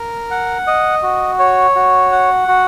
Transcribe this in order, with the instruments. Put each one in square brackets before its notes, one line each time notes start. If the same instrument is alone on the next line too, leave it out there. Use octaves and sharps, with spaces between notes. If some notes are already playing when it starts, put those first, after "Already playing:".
Already playing: [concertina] A#4
F#5
D#5
F#4
C#5
F#4
F#5
F#4